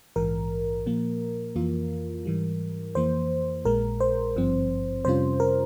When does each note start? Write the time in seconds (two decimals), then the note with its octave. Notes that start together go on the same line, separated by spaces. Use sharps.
0.16 A#1 G#2 E3 A#4
0.86 A#2 F3 A#3
1.56 F2 E3 A#3 F4
2.25 G#2 E3 G3
2.95 F2 E3 A#3 C5
3.65 A#1 A#2 G#3 A#4
4.00 C5
4.36 G#1 G2 F3 C4
5.05 F2 C3 G3 C#4 F4 C5
5.40 A#4